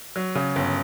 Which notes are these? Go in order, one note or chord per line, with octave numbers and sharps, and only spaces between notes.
F#3
C#3
G1